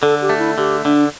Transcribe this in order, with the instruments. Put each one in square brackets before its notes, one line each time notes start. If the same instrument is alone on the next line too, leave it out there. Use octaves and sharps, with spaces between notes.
[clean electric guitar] D3 [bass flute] A4
[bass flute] G4
[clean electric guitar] A3
[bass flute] E4
[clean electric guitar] D3 [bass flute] G4
[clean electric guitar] D3 [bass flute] D4